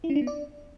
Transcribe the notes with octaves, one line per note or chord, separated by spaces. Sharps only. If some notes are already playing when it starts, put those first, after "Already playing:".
E4
C#4
D4
B3
D5